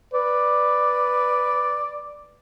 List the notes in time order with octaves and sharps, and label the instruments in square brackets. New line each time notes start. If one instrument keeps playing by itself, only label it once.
[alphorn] B4 [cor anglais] D5